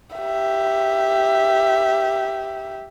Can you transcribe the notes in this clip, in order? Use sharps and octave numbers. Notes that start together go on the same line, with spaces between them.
G4 E5